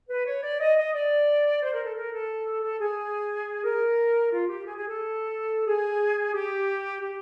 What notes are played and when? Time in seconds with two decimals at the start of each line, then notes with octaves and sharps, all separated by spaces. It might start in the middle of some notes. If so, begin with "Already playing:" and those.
0.09 B4
0.27 C#5
0.43 D5
0.61 D#5
0.78 D#5
0.94 D5
1.62 C5
1.73 A#4
1.84 A4
1.96 A#4
2.13 A4
2.63 A4
2.80 G#4
3.64 A#4
4.32 F4
4.49 G4
4.66 G#4
4.77 G#4
4.88 A4
5.67 G#4
6.34 G4
7.02 G4